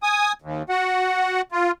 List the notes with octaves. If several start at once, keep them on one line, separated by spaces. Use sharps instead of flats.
G#5 D#6
D#2
F#4 F#5
F4